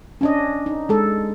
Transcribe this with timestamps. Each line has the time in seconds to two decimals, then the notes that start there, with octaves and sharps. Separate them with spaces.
0.21 C#4 D4 D#5
0.66 D#4
0.89 G#3 A4